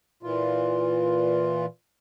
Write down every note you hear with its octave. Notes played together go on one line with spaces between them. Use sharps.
A#2 E3 F4